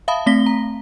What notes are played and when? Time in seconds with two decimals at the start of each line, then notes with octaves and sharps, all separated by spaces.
0.08 E5 F5 A5 B5 D#6
0.26 A3 C4 A#6 B6 G7
0.46 A#5